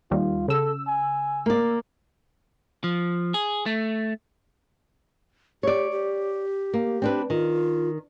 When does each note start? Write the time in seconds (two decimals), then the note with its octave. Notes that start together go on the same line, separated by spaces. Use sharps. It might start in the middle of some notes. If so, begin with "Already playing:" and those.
0.11 D#2 D#3 G3 F4
0.48 C#3 A4 E6
0.87 G#5
1.46 A#3 D5
2.84 F3
3.34 G#4
3.66 A3
5.63 G4 C#5 D5
5.92 G4
6.74 A#3
7.02 C4 D4 B4
7.30 D#3 F4